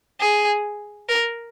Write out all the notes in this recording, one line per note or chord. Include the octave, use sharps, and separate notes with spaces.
G#4
A#4